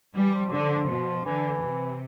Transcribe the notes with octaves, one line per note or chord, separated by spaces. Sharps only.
E3 G3
F3
D3
B2
D3 E3
C3